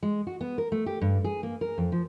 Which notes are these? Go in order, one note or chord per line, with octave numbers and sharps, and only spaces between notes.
G#3
F#4
B3
A#4
A3
G4
G2
G#4
A#3
A#4
F2
F3